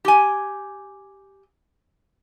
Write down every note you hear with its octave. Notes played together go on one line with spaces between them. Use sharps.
G4 G#5